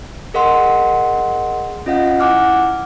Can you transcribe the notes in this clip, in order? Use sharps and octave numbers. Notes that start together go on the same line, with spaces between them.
G#4 A#4 D#5 F#5 C6
C#4 F4 D#5 F5 F#5
E4 F#5 G#5 D6 F6 F#6